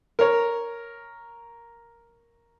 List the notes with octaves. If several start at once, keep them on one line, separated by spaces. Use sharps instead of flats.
A#4 C#5